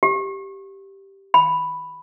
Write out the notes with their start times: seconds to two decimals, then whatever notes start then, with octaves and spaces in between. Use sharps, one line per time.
0.03 G4
1.34 B5